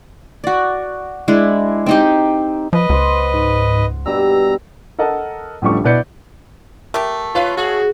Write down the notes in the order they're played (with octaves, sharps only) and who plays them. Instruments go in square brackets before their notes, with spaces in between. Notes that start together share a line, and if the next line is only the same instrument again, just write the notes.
[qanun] F#4 D5
G#3 D4 E4
C4 D#4 G4
[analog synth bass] F3 [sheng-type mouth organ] B4 D#5
[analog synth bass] C#2 [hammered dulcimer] C5 F#5
[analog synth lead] G#2
[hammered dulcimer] G2 B2 G3 [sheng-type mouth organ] A#5 [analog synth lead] E6
[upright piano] A4 A#4 D#5 F#5 A5
A1 D2 F3 G3 A3 C#6
B2 E4 B4 D5 G6 C#7
[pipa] A3 G4 [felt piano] A#4
[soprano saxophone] F4 [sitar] B4 [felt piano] C#5 F5
[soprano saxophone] F#4 [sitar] G#4